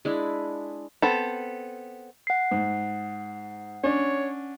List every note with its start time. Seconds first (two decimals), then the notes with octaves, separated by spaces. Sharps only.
0.05 G#3 D4 E4
1.02 B3 C4 A4
2.27 F#5 C7
2.51 G#2
3.83 C#4 D4 C#5